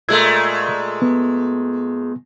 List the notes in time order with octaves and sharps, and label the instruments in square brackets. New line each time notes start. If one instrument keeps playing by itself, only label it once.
[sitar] A#2 G#3 A3 [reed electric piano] E6 G#6
[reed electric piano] B3